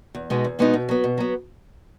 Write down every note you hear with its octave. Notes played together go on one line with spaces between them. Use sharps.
E2
B2 G#3 B3 D#4
E2
B2 G#3 B3 D#4
B2
F#3 B3
B2
F#3 B3